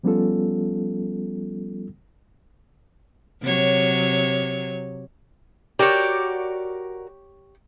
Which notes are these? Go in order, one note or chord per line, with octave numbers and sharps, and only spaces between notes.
F3 G3 B3 C#4 F4 A4
C3 F#3 C#5
F#4 G4 A#4 C#5 D5